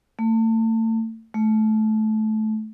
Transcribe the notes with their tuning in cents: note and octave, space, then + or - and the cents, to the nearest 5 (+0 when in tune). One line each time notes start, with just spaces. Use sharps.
A3 +35
A3 -20